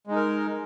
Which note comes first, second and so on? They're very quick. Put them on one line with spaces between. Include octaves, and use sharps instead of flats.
G#3 D#4 A#4